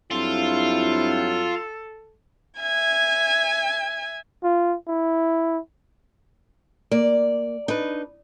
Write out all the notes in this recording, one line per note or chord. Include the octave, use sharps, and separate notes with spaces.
G2 F#3 C4 E4 F4 A4
E5 G#5 G#6
F4
E4
A#3 D5
D4 D#4 B4